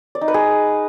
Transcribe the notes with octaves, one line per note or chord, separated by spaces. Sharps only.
D5
D#4
B4
G#4